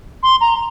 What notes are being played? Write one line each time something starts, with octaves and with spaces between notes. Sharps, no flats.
C6
A#5